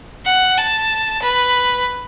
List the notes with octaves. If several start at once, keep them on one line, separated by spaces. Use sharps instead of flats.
F#5
A5
B4